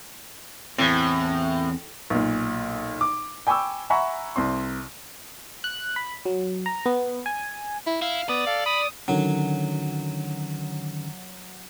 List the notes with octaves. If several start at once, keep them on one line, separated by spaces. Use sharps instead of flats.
E2 A2 C4
B1 A#2
D6
G5 G#5 B5 C#6 D6 E6
E5 F#5 G#5 A#5 B5 C#6
C2 C4 C6
F#6
B5
F#3
A#5
B3
G#5
E4
E4 F5
B3 D5 D#6
A4 F5
B5 D#6
D3 D#3 F#3 C#4